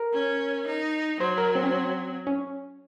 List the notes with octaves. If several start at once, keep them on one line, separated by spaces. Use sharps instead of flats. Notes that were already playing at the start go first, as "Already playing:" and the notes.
Already playing: A#4
C#4
D#4
F#3 C5
A#4
C4
C#4
C4
C#4